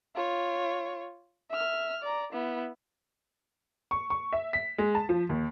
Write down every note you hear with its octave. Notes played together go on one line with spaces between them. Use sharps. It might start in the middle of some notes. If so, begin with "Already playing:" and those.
F4 C#5
E5 F6
D5 A#5
B3 E4
C#6
C#6
E5
B6
G#3
A5
F3
D#2